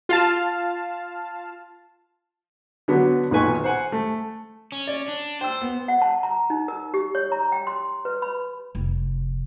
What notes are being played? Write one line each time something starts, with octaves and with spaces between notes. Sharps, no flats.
F4 F5 A5
D3 F#3 B3 D4
B1 A#2 D#3 B4 G#5 C#6
C5 F#5 G#5
A3
C#4
D5
D4
C5 G5 E6
B3
F#5
A5
A#5
D#4
A#4
G4
C#5
A#5
G5
C6
B4
B5
F1